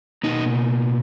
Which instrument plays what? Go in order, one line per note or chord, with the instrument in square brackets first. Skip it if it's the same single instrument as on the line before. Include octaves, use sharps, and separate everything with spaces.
[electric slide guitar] B2 A#3 D#4